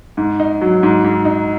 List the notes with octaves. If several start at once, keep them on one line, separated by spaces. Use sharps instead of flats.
G#2
D#4
F#3
G#2
G#2
D#4